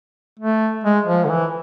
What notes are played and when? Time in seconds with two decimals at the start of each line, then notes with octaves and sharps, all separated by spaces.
0.39 A3
0.84 G#3
1.06 F3
1.25 D3
1.29 E3